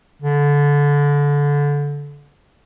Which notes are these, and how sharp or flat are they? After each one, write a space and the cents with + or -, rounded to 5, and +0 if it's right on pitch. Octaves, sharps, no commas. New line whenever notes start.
D3 -25